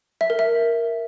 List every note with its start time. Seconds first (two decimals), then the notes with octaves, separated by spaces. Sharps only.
0.21 E5
0.30 A#4
0.39 E5